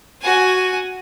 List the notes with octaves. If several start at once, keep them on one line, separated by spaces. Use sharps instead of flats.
F#4 G#5